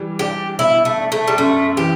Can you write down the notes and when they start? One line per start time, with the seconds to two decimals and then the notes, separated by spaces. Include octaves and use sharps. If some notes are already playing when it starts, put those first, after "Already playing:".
Already playing: E3 G3
0.19 D4 G4
0.59 B2 E4
0.85 A3
0.98 D4
1.12 A3
1.28 G3
1.38 F#2 A3
1.77 E3 G4